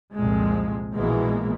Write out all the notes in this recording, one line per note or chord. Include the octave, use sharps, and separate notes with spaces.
C2 F2 A#2 G#3
A#1 B2 E3 G#3 A#3